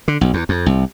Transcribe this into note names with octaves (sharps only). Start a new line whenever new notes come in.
D3
B1
E2
F2
C2